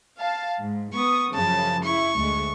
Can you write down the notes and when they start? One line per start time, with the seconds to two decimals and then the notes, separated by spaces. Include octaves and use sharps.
0.19 F5 A5
0.61 G#2
0.93 B3 C#6 D#6
1.34 F#2 C#3 F3 A5
1.84 E4 C#6
2.17 D2 G#3 A3